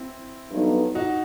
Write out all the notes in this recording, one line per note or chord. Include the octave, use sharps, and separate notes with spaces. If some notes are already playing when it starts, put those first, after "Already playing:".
Already playing: C4 E4
G2 F#3 B3 D#4 A4
D#4 F#4